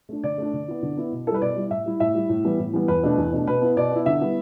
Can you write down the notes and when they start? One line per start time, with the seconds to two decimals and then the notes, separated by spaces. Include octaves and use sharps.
0.09 A3 D4
0.23 D3 D5
0.38 A3 D4
0.53 D3
0.68 B3 E4
0.83 D3
0.97 B3 E4
1.12 B2
1.27 E4 A4
1.30 G3 B4
1.42 B2 D5
1.56 G3 E4
1.70 A2 E5
1.86 G3 E4
2.00 A2 E5
2.15 G3 E4
2.29 A2
2.44 E3 G3 B3
2.59 A2
2.73 E3 G3 B3
2.88 E2 B4
3.03 B2 A3 D4
3.18 E2
3.33 B2 A3 D4
3.47 B2 B4
3.62 B3 E4
3.77 B2 D5
3.91 B3 E4
4.06 D3 E5
4.21 G3 B3 E4